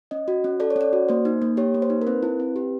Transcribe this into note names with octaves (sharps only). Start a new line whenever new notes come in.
C#4 D#5
F#4
C#4
A4 D5
C#5
C#4 D5
F#4
A#3 C5
D#4
A#3
G4 C#5
A#3
C5
D#4
A#4
C4 B4
E4
C4
G4